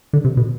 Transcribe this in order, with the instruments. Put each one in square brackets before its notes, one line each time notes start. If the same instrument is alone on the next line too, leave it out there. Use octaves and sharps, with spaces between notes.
[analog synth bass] D3
C3
B2